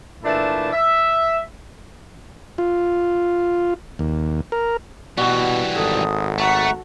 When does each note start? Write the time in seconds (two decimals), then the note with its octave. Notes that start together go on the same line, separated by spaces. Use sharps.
0.23 A#2 E3 A3 D4 E4 A5
0.72 E5
2.58 F4
3.99 D#2
4.52 A#4
5.17 B2 E3 G3 F#4
5.75 G#1 A4 D#6
6.38 A3 F#5 A#5 C#6